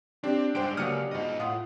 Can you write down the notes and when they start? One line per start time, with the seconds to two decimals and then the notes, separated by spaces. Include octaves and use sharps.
0.24 C4 D4 G4
0.55 G2 G#3 C5 G5 D7
0.77 C#2 F#3 A#3 D#6 F6 C#7
1.11 G#2 B2 F4 D#5
1.40 A2 F4 F#5 D#6